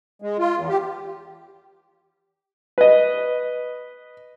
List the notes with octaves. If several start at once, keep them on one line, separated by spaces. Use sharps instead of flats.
G#3
F4
E2
G4
B4 D#5